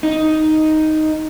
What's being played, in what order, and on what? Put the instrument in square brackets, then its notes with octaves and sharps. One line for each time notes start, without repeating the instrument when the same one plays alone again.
[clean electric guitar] D#4